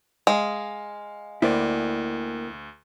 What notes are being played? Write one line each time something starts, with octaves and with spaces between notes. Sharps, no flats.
G#3 F5
D2 A#3 E4 A#4 C5 D5 G5